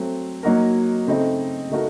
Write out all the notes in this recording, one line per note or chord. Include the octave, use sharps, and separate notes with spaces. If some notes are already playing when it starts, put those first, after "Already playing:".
Already playing: F#3 A3 C4
F#3 A#3 D#4 F#4 A#4
C#3 A3 C4 D#4
C#3 A3 D#4 F#4 A#4